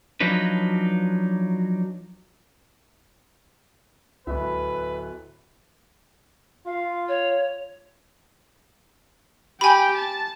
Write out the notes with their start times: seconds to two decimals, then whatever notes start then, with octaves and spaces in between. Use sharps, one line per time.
0.20 F3 F#3 D4 D#4 B4
4.27 D1 C#2 B4 E5
6.66 F4 F5
7.08 C#5
9.61 G4 G5 G#5 B5
9.97 A5